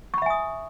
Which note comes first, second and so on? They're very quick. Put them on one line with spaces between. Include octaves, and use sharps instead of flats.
C#6 B5 E5 G#5 D#6